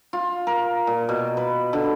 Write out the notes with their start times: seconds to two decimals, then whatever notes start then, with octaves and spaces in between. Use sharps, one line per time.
0.13 F4
0.47 A#4
0.87 A#2
1.09 B2
1.37 B4
1.73 D3